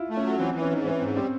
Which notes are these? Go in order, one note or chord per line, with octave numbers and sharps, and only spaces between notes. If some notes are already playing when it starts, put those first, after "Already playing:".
Already playing: E4 F4
A3
C#4
F#3
E3 C4
E3
C#4
G#2
E3 C#4
G#2 C4
G3 C4